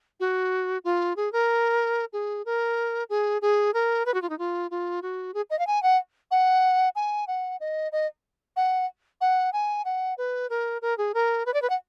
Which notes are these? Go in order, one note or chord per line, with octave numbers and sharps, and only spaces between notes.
F#4
F4
G#4
A#4
G#4
A#4
G#4
G#4
A#4
B4
F#4
F4
D#4
F4
F4
F#4
G#4
D#5
F5
G#5
F#5
F#5
G#5
F#5
D#5
D#5
F#5
F#5
G#5
F#5
B4
A#4
A#4
G#4
A#4
B4
D5
B4
F#5